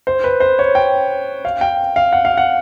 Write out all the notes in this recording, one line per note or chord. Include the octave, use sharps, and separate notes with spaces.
C5
B4
C5
C#5
G5
F5
G5
F5
F#5
F5
F#5